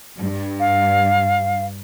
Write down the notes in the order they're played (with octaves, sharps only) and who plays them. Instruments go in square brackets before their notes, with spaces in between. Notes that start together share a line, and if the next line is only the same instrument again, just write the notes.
[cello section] G2
[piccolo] F5